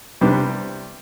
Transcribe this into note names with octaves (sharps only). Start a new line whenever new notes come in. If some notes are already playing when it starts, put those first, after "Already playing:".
C2 C3 G3 B3 D4